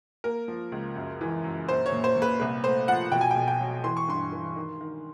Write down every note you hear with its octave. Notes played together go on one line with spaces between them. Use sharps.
A#3 A#4
F3
C#2
F#2
E3
F#2
A#1 C5
C#5
A#2
C5
A#2
B4
C2 B4
A3 C5
F3 F#5
B2 G5
G#5
B1 G5
G5
F#3
E3 C6
C#6
G2 C6
E3
D#3
D#3